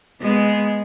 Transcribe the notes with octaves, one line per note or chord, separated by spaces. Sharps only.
G#3 B3